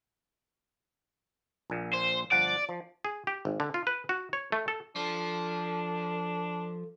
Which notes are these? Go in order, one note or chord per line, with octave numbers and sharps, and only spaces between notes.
A#1 A#2
C5
G1 F3 D5 F#5
F3
G#4
G4
G#1
D3
F4
B4
F#4
C#5
A3
A4
F3 D4 A4